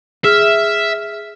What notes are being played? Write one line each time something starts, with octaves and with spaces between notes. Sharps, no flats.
G#4 E5 F6